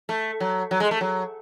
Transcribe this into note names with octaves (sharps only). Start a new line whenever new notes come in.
A3
F#3
F#3
G#3
A3
F#3